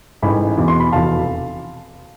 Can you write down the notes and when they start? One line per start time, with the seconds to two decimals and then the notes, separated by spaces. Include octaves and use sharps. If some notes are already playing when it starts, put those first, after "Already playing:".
0.22 A1 G#2 E3 G#5 B5
0.58 E2 B2
0.68 C6
0.80 B5
0.92 F1 E2 B2 F5 A5